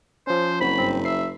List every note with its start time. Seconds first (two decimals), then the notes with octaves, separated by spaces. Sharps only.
0.27 F3 C#4 C5
0.61 F#1 C4 F#4 B5
0.78 G2 C4
1.05 E5 C7